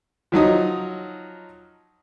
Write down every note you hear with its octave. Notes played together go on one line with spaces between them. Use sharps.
F3 F#3 D#4 D#6